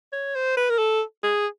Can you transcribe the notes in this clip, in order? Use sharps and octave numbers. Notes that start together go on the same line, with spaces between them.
C#5
C5
B4
A#4
A4
G#4